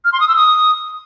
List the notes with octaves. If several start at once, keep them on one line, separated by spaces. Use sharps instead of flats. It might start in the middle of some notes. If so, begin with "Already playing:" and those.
F6
C6
D#6
E6
D#6